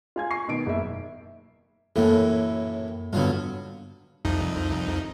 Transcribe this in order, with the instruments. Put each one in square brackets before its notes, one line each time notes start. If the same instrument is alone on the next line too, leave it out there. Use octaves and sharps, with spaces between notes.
[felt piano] F4 G#5 G#6
C#6 C7
B2 D#3 D7
F#1 E5
[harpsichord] F#2 A2 E3 [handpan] A#3 A4
[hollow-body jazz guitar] G2 D3 [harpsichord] B2 F#3 F4
[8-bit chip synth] C2 F2 D#4